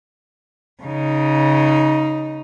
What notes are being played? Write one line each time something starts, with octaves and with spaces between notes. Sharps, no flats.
C#3 D#4